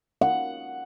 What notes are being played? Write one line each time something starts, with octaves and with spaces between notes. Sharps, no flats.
F#5